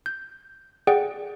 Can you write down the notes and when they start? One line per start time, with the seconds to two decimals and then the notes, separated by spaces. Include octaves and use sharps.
0.06 G6
0.87 G#4 D5 F#5 G5